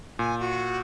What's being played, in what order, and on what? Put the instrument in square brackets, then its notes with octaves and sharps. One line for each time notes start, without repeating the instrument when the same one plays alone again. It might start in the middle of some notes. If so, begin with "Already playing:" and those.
[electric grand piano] A#2 [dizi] G#5
[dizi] F#4